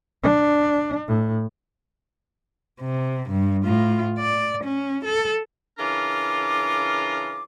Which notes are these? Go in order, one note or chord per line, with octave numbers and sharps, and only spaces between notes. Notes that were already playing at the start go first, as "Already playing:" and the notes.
D4
A2
C3
G2
A2 F4
D5
C#4
A4
C#3 E3 D4 F4 A#4 D6